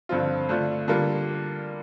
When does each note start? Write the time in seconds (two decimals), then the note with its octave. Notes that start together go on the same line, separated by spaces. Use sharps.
0.09 G2 D3 F3 C4 F4
0.49 D3 A3 D4 F4
0.88 D3 G3 A#3 F4